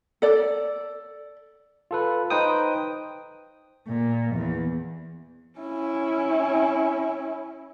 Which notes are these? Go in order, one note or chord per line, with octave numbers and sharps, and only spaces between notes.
A4 D5
F4 A4 B4
D#4 B4 C5 G5 D#6
A#2
E2
C#4 E4